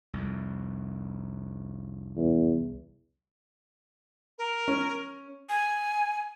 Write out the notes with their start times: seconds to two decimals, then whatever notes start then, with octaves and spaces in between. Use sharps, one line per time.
0.13 C2 F2
2.17 E2
4.38 A#4
4.68 C#4
5.49 G#5